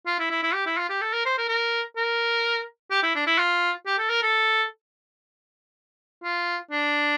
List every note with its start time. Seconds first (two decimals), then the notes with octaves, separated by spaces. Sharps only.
0.07 F4
0.19 E4
0.30 E4
0.43 E4
0.54 G4
0.66 E4
0.78 F4
0.90 G4
1.02 A4
1.13 A#4
1.25 C5
1.38 A#4
1.48 A#4
1.96 A#4
2.91 G4
3.03 E4
3.16 D4
3.27 E4
3.38 F4
3.86 G4
3.98 A4
4.10 A#4
4.22 A4
6.24 F4
6.71 D4